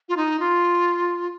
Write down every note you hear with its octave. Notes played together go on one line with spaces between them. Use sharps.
F4
D#4
F4